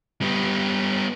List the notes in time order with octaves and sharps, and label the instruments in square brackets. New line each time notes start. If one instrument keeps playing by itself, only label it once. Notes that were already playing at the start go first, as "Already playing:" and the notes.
[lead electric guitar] G3 B3